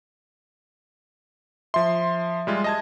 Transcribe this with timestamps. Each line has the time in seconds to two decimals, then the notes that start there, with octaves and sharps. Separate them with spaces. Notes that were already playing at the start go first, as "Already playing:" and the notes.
1.74 F3 E5 C6
2.47 G3 G#3 F4
2.64 D#5 A5 G#6